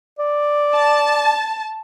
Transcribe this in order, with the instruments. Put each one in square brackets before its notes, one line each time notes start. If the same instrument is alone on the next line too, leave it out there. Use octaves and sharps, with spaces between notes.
[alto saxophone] D5
[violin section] A5